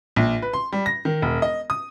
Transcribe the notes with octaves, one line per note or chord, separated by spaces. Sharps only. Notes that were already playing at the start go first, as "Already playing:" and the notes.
A#1
B4
C6
G3
A#6
D#3
E1
D#5
D#6